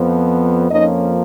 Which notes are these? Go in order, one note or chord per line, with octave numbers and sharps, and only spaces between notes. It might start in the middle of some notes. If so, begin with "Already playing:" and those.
Already playing: F2 F3 B3
F2 F3 A#3 C#4 D#4 D#5